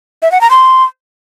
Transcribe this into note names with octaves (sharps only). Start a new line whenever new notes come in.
E5
F#5
A#5
C6